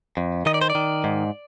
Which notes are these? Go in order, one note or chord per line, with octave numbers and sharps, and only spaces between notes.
F2
D#3 D#5
D5
C5
D5
D#3
G#2